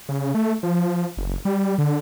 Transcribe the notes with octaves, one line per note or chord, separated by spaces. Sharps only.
C#3
A3
F3
F#1
G3
D3